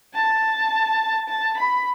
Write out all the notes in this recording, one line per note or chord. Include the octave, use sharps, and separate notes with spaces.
A5
A5
B5